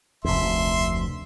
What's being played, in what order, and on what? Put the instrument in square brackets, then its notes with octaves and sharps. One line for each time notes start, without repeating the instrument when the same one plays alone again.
[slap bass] F1 D2 [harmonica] E5 C6